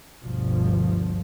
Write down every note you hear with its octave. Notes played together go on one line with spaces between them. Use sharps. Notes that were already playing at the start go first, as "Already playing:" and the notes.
G1 D2 G2 B2 F3